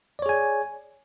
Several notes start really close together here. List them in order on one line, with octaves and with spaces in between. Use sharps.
D5 C#5 G#4 G#5